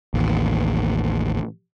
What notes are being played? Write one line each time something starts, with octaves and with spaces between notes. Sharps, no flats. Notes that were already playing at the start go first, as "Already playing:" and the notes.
A1 D#2